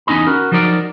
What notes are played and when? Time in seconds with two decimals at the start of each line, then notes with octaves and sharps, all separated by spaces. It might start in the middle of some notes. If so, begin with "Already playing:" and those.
0.07 E2 C#4 D#4 D#5 B5
0.27 F#4 A#4
0.52 F3 F#3 D#4 A#4 D5